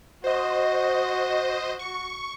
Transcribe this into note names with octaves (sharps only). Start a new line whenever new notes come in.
F#4 C5 D#5
C#6